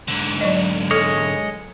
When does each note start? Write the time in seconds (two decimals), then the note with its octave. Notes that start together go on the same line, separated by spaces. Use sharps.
0.08 G#2 D3
0.41 F#3 D5 D#5
0.91 G#3 A4 C#5 D#5